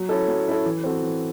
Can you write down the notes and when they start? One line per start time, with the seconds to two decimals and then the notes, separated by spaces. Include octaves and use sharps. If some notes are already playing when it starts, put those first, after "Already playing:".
Already playing: F#3
0.09 C#4 E4 A4
0.28 F#3
0.46 C#4 E4 A4
0.65 E3
0.84 C4 F#4 A4
1.03 E3